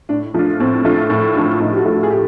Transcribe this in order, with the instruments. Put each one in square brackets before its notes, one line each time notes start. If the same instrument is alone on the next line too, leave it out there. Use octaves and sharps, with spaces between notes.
[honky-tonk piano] A2 [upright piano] D4
[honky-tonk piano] F3 A3 D4 F4
[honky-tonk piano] A2 [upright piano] C4
[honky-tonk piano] F3 A3 D4 F4
A2
F3 A3 D4 F4
[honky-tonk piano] A2 [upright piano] D#4
[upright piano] G4
F#4
[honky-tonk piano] F3 A3 D4 F4
[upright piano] F#4
G#4
G4